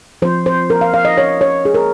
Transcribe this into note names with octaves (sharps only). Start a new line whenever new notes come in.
F3 C4 C5
C5
A#4
F5
F5
D#5
C#5
C#5
G#4
A#4